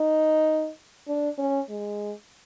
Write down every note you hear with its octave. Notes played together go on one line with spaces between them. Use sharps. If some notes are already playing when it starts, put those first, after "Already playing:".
Already playing: D#4
D4
C#4
G#3